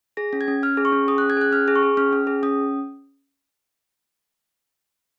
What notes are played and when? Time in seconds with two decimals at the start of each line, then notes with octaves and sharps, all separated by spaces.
0.17 G#4 A#6
0.33 C#4
0.41 G#6
0.48 C#4
0.63 C#4 F6
0.77 G#4
0.85 C#6
0.92 C#4
1.08 G#4 D#6
1.18 F#6
1.22 C#4
1.30 G#6
1.37 G#4 F#6
1.52 C#4 F6
1.68 G#4
1.76 C#6
1.83 G#4
1.97 C#4 F6
2.13 C#4
2.27 G#4
2.43 C#4 D#6